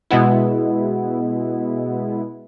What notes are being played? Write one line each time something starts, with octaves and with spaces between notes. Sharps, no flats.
B2 G#3 B3 E4